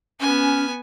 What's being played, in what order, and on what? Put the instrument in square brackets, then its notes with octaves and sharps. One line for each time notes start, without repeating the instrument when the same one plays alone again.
[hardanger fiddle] B3 G#5 [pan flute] C#4